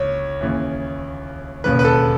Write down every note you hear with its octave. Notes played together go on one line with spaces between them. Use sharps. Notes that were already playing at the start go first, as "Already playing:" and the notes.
Already playing: C#2 C#5
D#2 C#3 E3
E1 D#2 C#3 B4
B4
A4